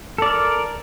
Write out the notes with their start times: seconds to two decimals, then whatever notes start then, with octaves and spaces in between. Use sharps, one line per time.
0.18 A4
0.22 D5
0.26 A#4